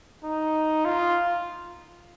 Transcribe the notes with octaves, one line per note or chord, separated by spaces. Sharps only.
D#4
F4